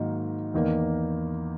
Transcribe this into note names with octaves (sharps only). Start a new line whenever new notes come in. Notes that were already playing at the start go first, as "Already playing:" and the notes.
Already playing: G#2 D#3 F#3 A#3
E2 D#3 A#3